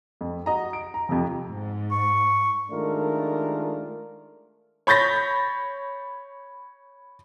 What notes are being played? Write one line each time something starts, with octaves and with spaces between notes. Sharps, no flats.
F2
F#4 D#5 A#5
D7
A#5
F2 C3 F3
G#2
C#6
D#3 G#3 A3 D4 F4 A#4
C#5 B5 G6 A6 A#6